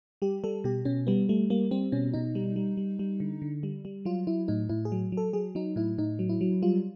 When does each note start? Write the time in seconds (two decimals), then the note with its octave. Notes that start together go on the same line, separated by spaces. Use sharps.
0.22 G3 G4
0.44 G3 A4
0.64 B2 G4
0.85 B2 C#4
1.07 G3 B3
1.29 G3 A3
1.50 G3 A#3
1.71 G3 C4
1.92 B2 C#4
2.14 B2 D#4
2.35 G3
2.56 G3
2.77 G3
2.99 G3
3.20 D3
3.42 D3
3.63 G3
3.85 G3
4.05 F#3 F4
4.27 F#3 E4
4.48 A2 D#4
4.69 A2 E4
4.85 G#4
4.92 F#3
5.12 F#3
5.17 A4
5.33 F#3 G#4
5.55 F#3 D#4
5.76 A2 E4
5.98 A2 D#4
6.19 F#3
6.29 E4
6.41 F#3
6.62 G3 F4